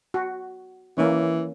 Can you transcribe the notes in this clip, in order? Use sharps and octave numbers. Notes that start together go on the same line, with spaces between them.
F#4
E3 A#3 C#4